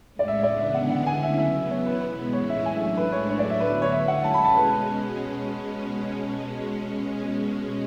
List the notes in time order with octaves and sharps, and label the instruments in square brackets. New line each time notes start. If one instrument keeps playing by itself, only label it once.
[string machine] A2 G#3 C#4
[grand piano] D5
E5
[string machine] C#3 E3 B3 D4 [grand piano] D5
[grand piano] E5
[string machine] D3 G#3 B3 D4 [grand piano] F#5
[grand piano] F#5
[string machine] D3 A3 C#4 E4 [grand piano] G#5
[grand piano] E5
[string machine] C#3 F#3 B3 [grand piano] E5
[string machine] E3 B3 E4 [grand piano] C#5
[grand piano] B4
[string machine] B2 G#3 B3 [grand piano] B4
[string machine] A2 E3 G#3 C#4 E4 [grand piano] C#5
[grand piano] E5
[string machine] F#3 A3 D4 [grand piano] G#5
[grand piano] E5
[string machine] A2 G#3 D4 [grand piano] B4
[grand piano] C#5
[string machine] A2 F#3 A3 D4 [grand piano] C#5
[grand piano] D5
E5
[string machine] D3 F#3 B3 [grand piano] B4
[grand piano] C#5
[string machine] D3 A3 C#4 E4 [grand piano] E5
[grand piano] F#5
[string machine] B2 G#3 C#4 [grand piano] A5
[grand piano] B5
A5
B4